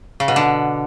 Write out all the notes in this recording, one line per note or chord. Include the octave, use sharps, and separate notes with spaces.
C#3
B2
D3